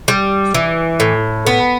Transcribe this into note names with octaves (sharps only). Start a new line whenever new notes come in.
G3
E3
A2
B3